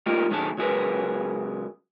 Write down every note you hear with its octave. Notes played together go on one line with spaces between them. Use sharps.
G3 A3 A#3 D#4 F4 A#4
B1 D#3 F#3 A3 G#4 A5
C#2 F#3 E4 G#4 A#4 B4